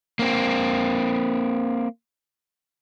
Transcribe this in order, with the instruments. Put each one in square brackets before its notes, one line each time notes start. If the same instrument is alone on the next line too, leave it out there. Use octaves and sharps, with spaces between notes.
[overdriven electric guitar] A#3 C4